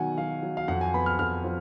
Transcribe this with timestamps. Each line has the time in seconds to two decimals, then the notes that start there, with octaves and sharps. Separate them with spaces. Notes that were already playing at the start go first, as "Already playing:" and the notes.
Already playing: B2 D#3 F#3 F#5 G#5
0.18 F#3 F5
0.43 F#3
0.57 F5
0.68 F2 F#5
0.81 G#5
0.94 B3 B5
1.06 F6
1.19 F2 F6
1.44 F3